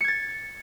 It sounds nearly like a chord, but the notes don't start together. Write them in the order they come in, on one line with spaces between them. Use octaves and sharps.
C#7 G#6 A6